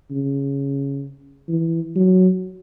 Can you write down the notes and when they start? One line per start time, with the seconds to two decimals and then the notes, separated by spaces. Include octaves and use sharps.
0.11 C#3
1.49 E3
1.96 F#3